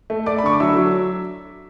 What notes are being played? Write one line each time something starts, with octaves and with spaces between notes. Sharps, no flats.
A3
A3 D5 D6
B5
D3 C#6
D6
F#3 E5 E6
F#3